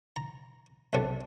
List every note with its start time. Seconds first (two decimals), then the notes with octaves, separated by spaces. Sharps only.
0.16 A#5
0.93 B1 F#2 C3 D4 A4